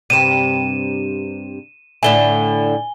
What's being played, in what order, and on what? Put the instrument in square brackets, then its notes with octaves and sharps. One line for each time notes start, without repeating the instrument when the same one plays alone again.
[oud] G2 C3 [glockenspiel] D#7 E7
[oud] A2 D3 E4 [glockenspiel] G#5 G7